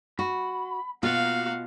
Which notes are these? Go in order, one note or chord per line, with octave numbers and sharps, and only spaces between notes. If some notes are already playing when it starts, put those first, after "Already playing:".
F#4 B5
B2 A#3 F4 F#4 F5